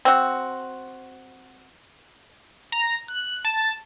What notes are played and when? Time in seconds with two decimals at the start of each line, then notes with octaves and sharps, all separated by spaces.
0.05 C4 F#4
2.72 A#5
3.08 F#6
3.45 A5